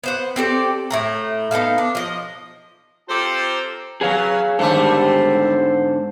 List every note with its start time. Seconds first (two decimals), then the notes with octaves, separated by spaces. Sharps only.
0.04 B3 C5 F#5
0.36 C4 G4 A4 D5
0.90 A2 A3 A#5
1.51 B3 D#4 A4 F5
1.78 D4
1.95 F3 D#5
3.09 C4 F4 G4 A4 C5 A#5
4.01 F#3 B3 G#4 C#5 F5
4.59 D#2 G#2 D3 G3 A3 A4 C5